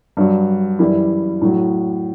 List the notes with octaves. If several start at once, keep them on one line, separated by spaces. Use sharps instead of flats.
G2 F#3
F#2 E3 G3 E4
A2 F#3